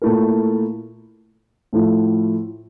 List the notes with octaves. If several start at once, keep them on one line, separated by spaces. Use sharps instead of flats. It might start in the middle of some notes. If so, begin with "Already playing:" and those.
A#2 A3 E4 A#4
A2 F3 A3 E4